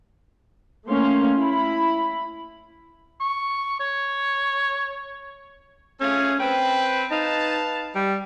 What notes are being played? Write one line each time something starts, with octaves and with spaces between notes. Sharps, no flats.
A3 A#3 C#4 F5 C6
E4 B5
C#6
C#5
A3 C#4 F4 G#4
C4 B4 G5
D#4 B4 F5 A5
G3